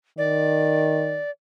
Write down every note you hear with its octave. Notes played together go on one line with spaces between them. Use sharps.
D#3 D5